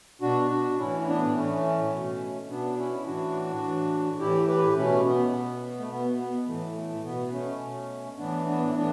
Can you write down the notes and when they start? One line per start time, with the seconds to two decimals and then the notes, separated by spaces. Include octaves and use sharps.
0.22 B2 D4 F#4
0.51 D4 F#4
0.78 A2 E3 C#4 E4
1.01 E4
1.07 B3 D4
1.35 A2 E3 A3 C#4
1.92 B2
2.49 B2 B3 D4
2.77 C#4 E4
3.05 A2 E3 D4 F#4
3.63 A2 E3
4.19 A2 E3 E4 G4
4.48 G4 B4
4.76 B2 A3 C#4
5.05 B3
5.33 B2
5.79 A3
5.90 B2 B3
6.19 B3
6.47 A2 E3 A3
6.76 A3
7.04 B2 B3
7.32 A3 C#4
7.61 B2
8.17 A2 E3 B3 D4
8.46 B3 D4
8.70 E4
8.74 A2 E3 B3 D4